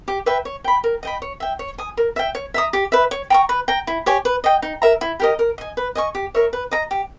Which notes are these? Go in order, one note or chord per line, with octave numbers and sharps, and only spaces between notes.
G4
B4 E5 G5
C#5
G5 B5
A#4
D#5 G5 B5
C#5
E5 G5
C#5
G#5 D#6
A#4
E5 G5
C#5
E5 A#5 D#6
G4
B4 E5
C#5
G5 A#5 C#6
B4
G5 A#5
E4
G4 C#5 G#5
B4
D#5 G5
D#4
A#4 E5 A#5
E4
G4 A#4 D#5
A#4
D#5 G#5
B4
D#5 G#5 C#6
G4
A#4 C#5 E5
B4
D#5 A#5
G4